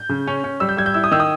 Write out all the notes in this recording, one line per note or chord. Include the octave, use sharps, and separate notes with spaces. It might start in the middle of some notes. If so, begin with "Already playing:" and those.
Already playing: G6
C#3
C#4
C#4
G3 E6
G6
G3 G#6
G6
E4 E6
D#6
D#3 E6
D#6